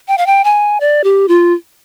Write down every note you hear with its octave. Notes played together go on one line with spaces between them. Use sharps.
G5
F5
G5
G#5
D5
G4
F4